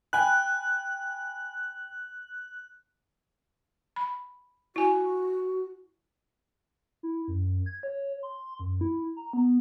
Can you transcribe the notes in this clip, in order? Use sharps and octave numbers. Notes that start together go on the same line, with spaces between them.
G5 G#5 B5 F#6
B5
E4 F#4 G#5
E4
F#2
G#6
C#5
C6
F#2
E4
A#5
B3